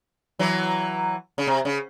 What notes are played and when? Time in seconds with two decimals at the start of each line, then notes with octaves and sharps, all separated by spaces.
0.39 E3 F#3
1.38 C#3
1.47 C3
1.65 C#3